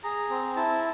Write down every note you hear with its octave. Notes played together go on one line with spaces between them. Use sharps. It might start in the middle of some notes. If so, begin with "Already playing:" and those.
G#4 A#5
C4
E4 A5